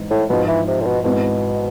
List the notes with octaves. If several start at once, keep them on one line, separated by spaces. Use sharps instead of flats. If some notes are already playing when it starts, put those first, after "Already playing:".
Already playing: G#1 G#2 E3
A2
G#2 B2 F3 G#3
E3
C3
A2
B2
G#1 G#2 B2 G#3 B3 E4